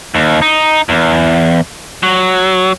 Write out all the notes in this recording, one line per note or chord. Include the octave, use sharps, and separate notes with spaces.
D#2
D#4
E2
F#3